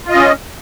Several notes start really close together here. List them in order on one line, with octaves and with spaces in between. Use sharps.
F4 D#5 C#4